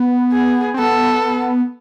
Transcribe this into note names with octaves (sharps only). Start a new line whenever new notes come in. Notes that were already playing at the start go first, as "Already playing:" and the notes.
Already playing: B3
G#4
C4
B3 A4